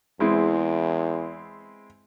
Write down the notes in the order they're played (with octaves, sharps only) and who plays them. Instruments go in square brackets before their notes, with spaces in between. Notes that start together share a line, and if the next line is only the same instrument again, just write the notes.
[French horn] E2 [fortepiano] G#3 C4 E4